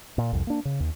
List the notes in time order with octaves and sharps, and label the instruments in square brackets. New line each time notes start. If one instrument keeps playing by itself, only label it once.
[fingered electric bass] A#2
C2 F2
A#3 D4
C#3
D#2